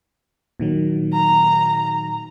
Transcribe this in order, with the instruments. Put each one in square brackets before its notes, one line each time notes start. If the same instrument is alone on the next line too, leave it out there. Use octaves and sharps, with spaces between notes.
[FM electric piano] A#2 D#3 F#3
[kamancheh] A#5